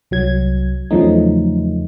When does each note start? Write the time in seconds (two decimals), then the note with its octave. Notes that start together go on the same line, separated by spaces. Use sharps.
0.11 C2 F#3 G#6
0.91 E2 C#3 F3 F#3 A3 D#4